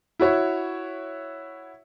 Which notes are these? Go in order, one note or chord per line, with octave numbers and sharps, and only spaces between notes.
E4 F#4 C#5 E5